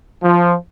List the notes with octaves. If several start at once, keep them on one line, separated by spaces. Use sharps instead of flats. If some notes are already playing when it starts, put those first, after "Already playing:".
F3